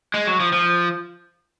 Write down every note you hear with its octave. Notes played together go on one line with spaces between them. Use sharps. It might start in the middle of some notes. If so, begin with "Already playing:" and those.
G#3
F#3
F3
F3